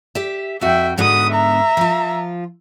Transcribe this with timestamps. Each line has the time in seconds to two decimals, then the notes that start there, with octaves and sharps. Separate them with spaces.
0.15 G4 E5
0.61 F2 F#4 E5 G5
0.98 G#2 D3 B3 F#4 D#6
1.32 E5 A#5
1.77 F3 F4